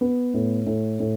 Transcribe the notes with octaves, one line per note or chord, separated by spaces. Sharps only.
B3
A2
A2
A2